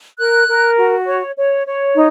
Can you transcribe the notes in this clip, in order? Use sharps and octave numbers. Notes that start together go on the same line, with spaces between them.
A#4 F#6
A#4
F#4
C#5
C#5
C#5
D#4